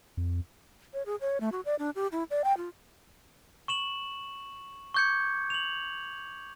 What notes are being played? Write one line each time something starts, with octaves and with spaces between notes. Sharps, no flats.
F2
C#5
G#4
C#5
A3
F#4
D5
D4
G4
E4
D5
G5
F4
C#6 E7 F#7
C#6 D6 G6 G#6 C#7
F7 F#7